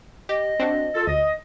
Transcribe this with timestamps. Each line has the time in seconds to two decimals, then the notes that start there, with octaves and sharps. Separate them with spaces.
0.29 G4 D#5
0.59 C4 D4 F#4
0.95 F4 A4
1.07 D2 D#5